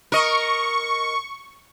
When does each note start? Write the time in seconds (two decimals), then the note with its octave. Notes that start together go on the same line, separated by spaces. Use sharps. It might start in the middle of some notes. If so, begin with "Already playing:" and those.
0.12 A#4 D#5 C#6